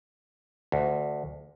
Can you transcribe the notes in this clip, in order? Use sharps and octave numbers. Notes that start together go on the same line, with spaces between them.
D2